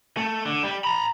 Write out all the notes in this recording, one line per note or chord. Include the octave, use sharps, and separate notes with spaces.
A3
D3
G3
A#5 B5